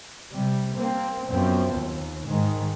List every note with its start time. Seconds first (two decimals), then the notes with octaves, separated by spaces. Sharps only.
0.31 C3 G3
0.75 A#3 C4
1.31 F#2 F3 B3 C4
1.76 D#2
2.26 G#2 D#3 G#3